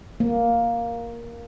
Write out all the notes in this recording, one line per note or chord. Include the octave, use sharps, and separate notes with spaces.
A#3